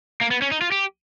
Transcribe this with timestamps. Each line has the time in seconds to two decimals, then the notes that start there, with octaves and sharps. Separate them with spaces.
0.21 A#3
0.31 B3
0.42 C#4
0.52 D#4
0.61 F4
0.72 G4